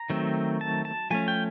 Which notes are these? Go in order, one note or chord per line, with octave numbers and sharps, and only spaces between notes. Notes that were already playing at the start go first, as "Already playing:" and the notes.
Already playing: A#5
D#3 F#3 A3 C4
A5
A5
F3 A3 C#4 G#5
G5